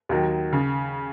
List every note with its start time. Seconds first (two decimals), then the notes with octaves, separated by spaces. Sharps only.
0.09 D#2 D#3 F#3
0.53 C#3